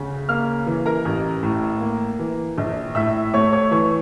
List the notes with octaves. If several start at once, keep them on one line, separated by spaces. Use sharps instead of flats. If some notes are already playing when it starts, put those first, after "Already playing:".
Already playing: D2 C#3
A#3 F5 F6
E3
A#4 A#5
A1
A2
A#3
E3
A#1
A2 E5 E6
A3 C#5 C#6
C#5 C#6
E3 C#5 C#6